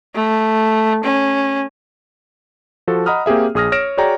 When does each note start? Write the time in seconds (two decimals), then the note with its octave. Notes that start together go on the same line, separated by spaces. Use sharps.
0.15 A3
1.04 C#4
2.88 F3 F#4 A4
3.06 D#5 F#5 A#5 B5 D#6 F6
3.26 A#3 C4 G4 G#4 E5
3.55 A#1 G#4 D#6 F6 A#6
3.72 C#5 F6 A#6 D7 E7
3.97 F#4 G#4 C#5 D5 G5 A#5